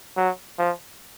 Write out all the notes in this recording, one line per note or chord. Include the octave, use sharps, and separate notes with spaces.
F#3
F3